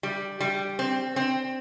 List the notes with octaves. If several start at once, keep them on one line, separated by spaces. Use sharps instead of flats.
G3
G3
C4
C4